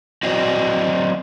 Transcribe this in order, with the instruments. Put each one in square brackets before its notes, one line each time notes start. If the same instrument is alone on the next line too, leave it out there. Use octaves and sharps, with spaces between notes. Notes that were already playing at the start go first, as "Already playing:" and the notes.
[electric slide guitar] F#3 C4 F#4 C5 D5 D#5